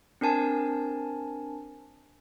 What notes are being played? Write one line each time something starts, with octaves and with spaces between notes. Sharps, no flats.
C4 D4 A#4 G#5 A5